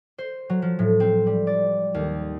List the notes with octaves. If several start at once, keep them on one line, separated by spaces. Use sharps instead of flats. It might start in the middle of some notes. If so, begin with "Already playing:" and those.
C5
F#3
F3
A2
C4
G3
D5
D#2